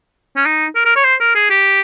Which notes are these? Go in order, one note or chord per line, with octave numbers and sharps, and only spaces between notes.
C#4
D#4
A#4
A#4
C#5
C5
A#4
G#4
G4